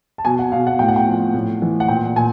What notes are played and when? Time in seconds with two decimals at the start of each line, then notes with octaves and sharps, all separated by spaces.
0.18 A5
0.25 B2 G#5
0.39 F#5
0.52 B2 F5
0.67 F#5
0.79 A2 G5
0.88 F#5
0.96 G5
1.07 F3
1.34 A2
1.62 E3
1.80 F#5
1.88 A#2 G5
2.16 A#2 G#5